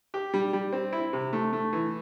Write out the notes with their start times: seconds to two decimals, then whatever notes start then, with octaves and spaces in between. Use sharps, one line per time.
0.14 G4
0.34 G3
0.53 G3
0.73 C4
0.93 E4
1.13 C3
1.33 A3
1.53 A3
1.73 E3